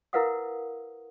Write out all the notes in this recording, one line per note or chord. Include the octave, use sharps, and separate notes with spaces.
E4 A#4 B4 F5 F#5 D#6